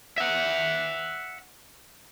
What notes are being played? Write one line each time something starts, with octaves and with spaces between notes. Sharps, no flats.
E5 F#5